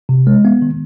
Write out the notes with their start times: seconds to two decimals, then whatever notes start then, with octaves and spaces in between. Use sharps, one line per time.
0.09 C3
0.27 G#3
0.45 B3
0.62 D#3